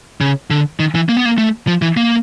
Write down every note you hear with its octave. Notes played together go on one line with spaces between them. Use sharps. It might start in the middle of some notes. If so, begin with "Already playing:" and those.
C#3
D3
D#3
E3
A#3
B3
A#3
A3
F3
E3
A#3